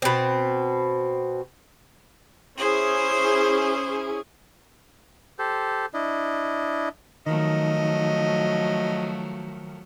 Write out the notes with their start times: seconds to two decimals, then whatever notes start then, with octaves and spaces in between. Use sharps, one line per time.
0.02 B2 C4
2.57 C#4 E4 G#4 C5
5.39 G4 A4 C5
5.94 D4 E4 D#5
7.26 D#3 F3 F#3 A3 D#5